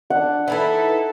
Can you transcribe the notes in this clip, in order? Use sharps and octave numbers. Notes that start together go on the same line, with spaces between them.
D4 F#5
E3 D#4 E4 A4 B4